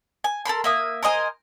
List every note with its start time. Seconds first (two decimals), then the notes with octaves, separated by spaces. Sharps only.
0.24 G#5
0.45 A4 A#4 B5 C6
0.64 A#3 E5 D#6
1.03 A#4 C5 D#5 G#5